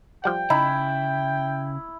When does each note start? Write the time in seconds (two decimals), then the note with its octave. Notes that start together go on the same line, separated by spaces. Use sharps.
0.24 F3 G3 F#5 G5
0.50 C#3 D#4 E4